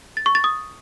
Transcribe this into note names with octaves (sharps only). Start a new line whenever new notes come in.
A6
C#6
A6
D#6